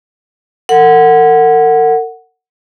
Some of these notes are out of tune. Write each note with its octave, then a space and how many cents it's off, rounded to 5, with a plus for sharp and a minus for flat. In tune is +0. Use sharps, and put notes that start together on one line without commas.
A#4 -45 F#5 +0